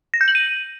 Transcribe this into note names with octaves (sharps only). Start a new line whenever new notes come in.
A#6
G6
F#7
D#7